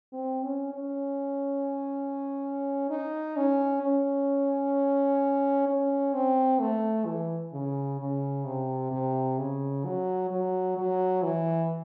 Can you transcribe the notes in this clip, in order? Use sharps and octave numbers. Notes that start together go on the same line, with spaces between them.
C4
C#4
C#4
D#4
C#4
C#4
C#4
C4
A3
E3
C#3
C#3
C3
C3
C#3
F#3
F#3
F#3
E3